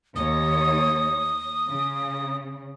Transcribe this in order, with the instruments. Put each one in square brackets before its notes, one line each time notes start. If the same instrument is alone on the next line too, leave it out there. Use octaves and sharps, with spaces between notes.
[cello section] D#2 C#5 [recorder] D#6
[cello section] C#3